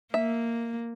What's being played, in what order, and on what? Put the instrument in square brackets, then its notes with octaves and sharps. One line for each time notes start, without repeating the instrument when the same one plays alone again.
[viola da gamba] A#3 [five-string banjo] E5